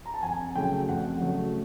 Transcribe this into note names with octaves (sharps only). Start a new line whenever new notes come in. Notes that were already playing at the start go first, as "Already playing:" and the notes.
A#5
A5
F2 G#5
C#3 F#3 A3 G5
F2 F#5
C#3 F#3 A3